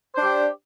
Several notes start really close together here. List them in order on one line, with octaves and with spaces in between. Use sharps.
C5 D4 G4